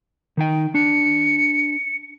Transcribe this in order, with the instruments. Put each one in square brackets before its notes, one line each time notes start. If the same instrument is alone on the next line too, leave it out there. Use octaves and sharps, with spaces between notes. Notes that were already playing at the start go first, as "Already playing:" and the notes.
[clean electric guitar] D#3 D#4 G5
[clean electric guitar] D4 [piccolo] C#7